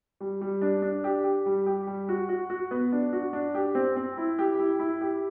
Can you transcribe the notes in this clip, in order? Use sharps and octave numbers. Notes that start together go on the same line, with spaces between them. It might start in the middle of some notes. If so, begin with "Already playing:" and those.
G3
G3
D4
D4
G4
G4
G3
G4
G3
F#4
F#4
F#4
B3
D4
F#4
D4
G4
C4
C4
E4
G4
E4
E4
G4